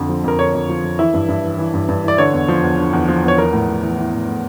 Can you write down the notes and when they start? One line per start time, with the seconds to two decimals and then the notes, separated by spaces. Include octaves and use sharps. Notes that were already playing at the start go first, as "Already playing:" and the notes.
Already playing: F2 D3
0.09 F3
0.24 F2 A#4
0.39 D3 C#5
0.54 F2
0.69 F3
0.84 F2
0.99 E3 E4 E5
1.14 G2
1.29 G2
1.44 E3
1.59 E3
1.74 G2
1.89 G2
2.04 E3 D5
2.18 D3 C#5
2.33 E2
2.48 F3
2.63 E2
2.78 D3
2.93 E2
3.08 F3
3.23 E2 C#5
3.38 E3 A#4
3.53 A2
3.68 A2
3.83 E3
3.98 E3
4.13 A2
4.28 A2